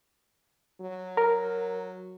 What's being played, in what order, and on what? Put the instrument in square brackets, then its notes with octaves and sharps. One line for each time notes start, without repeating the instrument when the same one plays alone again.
[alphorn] F#3
[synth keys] A#4